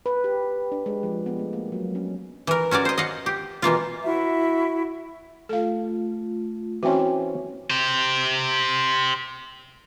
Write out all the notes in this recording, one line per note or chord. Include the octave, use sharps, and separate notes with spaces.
B4
G4
D4
G#3
F3
B3
A3
A#3
F#3
C#4
E3 A#4
C#4 F#4 A#4 D5
C5 D#5
D#5 F5 F#5
G4
B2 E3 A#3 F4
E4 F#4 E5
A3 F4 A4 F5
E3 C4 C#4 F#4 E5
G4 C5